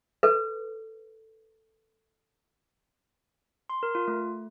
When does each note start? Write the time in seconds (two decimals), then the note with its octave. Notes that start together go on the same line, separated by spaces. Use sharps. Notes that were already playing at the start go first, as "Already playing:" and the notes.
0.23 A4 B4
3.70 C6
3.83 A#4
3.95 F4
4.08 A3